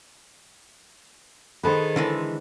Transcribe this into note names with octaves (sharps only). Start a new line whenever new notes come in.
D#3 G#4 A4 B4 C5
D3 E3 G#3